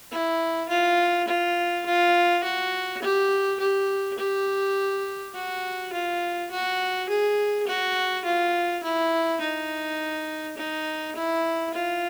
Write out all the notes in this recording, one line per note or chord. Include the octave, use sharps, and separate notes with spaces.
E4
F4
F4
F4
F#4
G4
G4
G4
F#4
F4
F#4
G#4
F#4
F4
E4
D#4
D#4
E4
F4